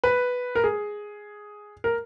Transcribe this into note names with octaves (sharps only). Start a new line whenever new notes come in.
B4
A#4
G#4
A#4